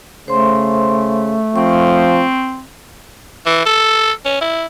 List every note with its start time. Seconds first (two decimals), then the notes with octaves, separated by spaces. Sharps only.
0.28 C#3 A3 C5 C6
1.56 F3 C4 C#6
3.46 E3
3.66 A4
4.25 C#4
4.41 E4